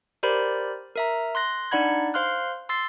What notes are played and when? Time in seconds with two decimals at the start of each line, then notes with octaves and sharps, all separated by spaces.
0.23 G4 A#4 C5 D5 B5
0.96 A#4 E5 A#5
1.35 C6 F#6 A#6
1.71 D4 D#4 D5 F#5 B5 G#6
2.14 C5 F5 C6 F6 F#6
2.69 C6 E6 A6 C7